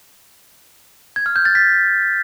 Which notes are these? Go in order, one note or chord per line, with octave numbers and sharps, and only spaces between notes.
G#6
F6
G6
A6
B6